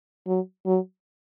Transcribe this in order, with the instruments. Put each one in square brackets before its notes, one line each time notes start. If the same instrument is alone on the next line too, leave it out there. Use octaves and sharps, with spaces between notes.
[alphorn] F#3
F#3